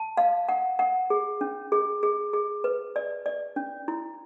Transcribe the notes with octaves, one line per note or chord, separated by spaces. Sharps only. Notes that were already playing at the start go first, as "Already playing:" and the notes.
Already playing: A5
F5
F#5
F#5
G#4
C#4
G#4
G#4
G#4
B4
D5
D5
C#4
E4